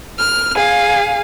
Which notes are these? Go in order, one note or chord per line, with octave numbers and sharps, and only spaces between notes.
F6
G#4 F5